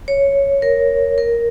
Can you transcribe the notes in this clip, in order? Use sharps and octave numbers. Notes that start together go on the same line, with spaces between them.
C#5
A#4
A#4